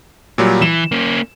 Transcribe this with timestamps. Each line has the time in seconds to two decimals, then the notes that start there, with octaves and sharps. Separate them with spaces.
0.38 A#2 F#3 G3
0.62 E3 E7
0.92 A#3 C#4